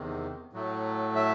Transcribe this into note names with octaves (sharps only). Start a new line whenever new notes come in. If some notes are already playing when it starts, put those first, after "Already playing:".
Already playing: E2 C3 D#3
A2 F#3 A3
E5